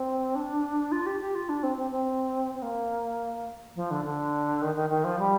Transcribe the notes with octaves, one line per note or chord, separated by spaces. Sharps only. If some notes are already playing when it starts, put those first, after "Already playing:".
Already playing: C4
D4
F4
G4
G4
F4
D4
C4
C4
C4
C4
A#3
F3
D3
D3
D#3
D#3
D#3
F3
G3